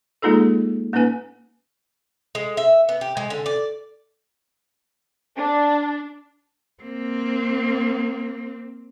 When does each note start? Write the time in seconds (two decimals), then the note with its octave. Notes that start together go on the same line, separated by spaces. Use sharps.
0.22 G#3 A#3 D#4 F4 G#4 A4
0.93 A#3 C#4 D#4 B4 G#5
2.35 G#3
2.57 E5
2.89 B3
3.01 G4
3.17 G#3
3.30 D3
3.46 D5
5.37 D4
6.83 A#3 C4